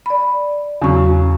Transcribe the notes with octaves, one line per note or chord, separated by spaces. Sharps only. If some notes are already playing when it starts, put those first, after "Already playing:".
D5 B5
E2 C#3 F#3 C#6